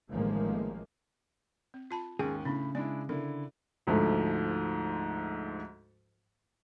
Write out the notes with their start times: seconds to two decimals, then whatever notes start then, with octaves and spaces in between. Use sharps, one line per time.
0.10 A1 D#3 F3 G#3 A#3
1.74 C4
1.91 F4 A5 B5
2.19 D#2 G#2 C#4 G#4 G5
2.45 A2 C#3 D4 E4 B5
2.75 G#3 D4 E4 D5
3.09 D3 E4 A#4
3.87 D2 G#2 F3 A3